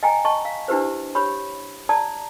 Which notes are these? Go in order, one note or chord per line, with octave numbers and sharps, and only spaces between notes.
D#5 G5 G#5 A#5
D#5 A5 C#6
F5
D4 E4 G4 B4 C5
G4 C#5 B5
D5 A5 A#5 D#6